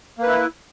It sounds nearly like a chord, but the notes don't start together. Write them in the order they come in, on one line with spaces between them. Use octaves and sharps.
A#3 B4 E4